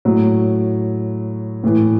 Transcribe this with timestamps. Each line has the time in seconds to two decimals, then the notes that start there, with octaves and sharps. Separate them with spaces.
0.05 A2 F#3
1.64 A2 E3